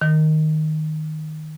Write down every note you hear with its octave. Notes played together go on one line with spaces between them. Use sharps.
D#3